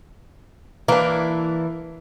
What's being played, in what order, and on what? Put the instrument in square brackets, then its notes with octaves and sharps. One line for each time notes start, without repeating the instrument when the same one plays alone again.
[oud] E3 [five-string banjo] A#3 D4